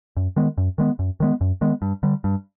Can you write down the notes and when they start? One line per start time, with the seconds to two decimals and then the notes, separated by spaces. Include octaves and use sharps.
0.17 F#2
0.36 D#3 G#3 B3
0.58 F#2
0.78 D#3 G#3 B3
0.99 F#2
1.20 D#3 G#3 B3
1.41 F#2
1.61 D#3 G#3 B3
1.82 G2
2.03 D3 G3
2.24 G2